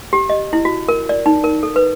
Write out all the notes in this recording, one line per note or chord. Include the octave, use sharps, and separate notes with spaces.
G4
D#5
E4
F#4
A#4
D5
D#4
A#4
A4
B4